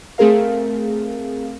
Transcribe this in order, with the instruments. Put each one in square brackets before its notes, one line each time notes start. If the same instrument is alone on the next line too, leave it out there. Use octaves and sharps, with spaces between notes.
[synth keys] A3 C4 G#4 A#4 F5